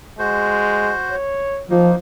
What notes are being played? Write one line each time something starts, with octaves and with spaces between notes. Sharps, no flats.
G#3 F#4 C5
C#5
F3 A#3 D#4